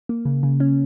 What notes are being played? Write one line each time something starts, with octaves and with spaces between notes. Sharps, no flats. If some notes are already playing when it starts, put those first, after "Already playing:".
A#3
C#3
C#3
C#4